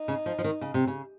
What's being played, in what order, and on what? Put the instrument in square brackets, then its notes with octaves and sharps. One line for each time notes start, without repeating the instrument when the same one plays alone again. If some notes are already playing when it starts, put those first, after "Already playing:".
Already playing: [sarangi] D#4
[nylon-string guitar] C#3
F3
F3
D#3
C#3
C3
C#3